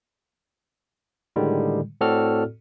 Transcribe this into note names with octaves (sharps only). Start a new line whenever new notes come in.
A2 D3 D#3 G3 G#3
A2 C4 F#4 A4 D5 F6